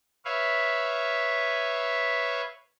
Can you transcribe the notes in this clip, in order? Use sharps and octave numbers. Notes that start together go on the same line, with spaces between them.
B4 C#5 E5 F5